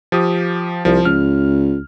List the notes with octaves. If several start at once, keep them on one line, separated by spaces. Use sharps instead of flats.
F3 G4 D#6
C2 F3
C#2 F6